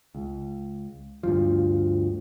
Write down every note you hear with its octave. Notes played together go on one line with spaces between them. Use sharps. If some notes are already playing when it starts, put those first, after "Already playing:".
C#2
D2 G2 F3